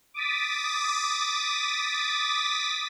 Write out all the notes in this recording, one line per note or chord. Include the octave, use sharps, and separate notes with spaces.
D6 D#6 A6 B6